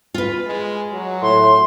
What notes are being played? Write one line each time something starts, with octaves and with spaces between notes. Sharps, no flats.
F4 B4
G#3
F#3
A2 C6